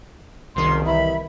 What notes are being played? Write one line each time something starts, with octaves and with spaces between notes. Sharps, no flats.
F#1 C2 D#3 C6
E3 E5 B5